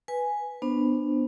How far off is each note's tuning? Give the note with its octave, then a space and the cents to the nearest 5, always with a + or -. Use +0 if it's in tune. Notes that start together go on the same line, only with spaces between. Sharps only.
B4 +0 G#5 +0
B3 +0 D4 +25 C5 +0